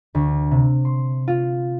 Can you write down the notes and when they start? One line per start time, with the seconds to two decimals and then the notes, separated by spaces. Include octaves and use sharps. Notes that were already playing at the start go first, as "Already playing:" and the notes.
0.15 D2
0.51 C3
0.85 C6
1.28 F4